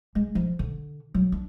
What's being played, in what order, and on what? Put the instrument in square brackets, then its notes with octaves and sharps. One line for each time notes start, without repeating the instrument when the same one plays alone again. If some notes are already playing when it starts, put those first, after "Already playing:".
[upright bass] G#3
F3
D3
F#3
D4